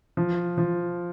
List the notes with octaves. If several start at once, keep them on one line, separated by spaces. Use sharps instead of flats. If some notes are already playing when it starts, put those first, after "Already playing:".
F3
F3